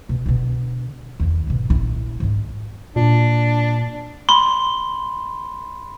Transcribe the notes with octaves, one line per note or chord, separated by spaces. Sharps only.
B2
B2 D3
E2 D#3
G#2 B2
A#1 E4
G#2 G#3
A#2 D4
B5 C6